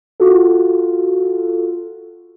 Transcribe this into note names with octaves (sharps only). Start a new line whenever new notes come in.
F4 F#4 A4